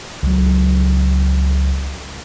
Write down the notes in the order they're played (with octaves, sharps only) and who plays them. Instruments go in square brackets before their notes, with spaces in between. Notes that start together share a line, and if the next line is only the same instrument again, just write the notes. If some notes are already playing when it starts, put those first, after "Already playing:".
[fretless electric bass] C#2 F#3